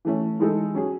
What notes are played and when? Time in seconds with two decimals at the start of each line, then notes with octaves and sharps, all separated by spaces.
0.05 E3 A3 C#4
0.39 E3 G#3 D#4 A4
0.74 F#3 C#4 G#4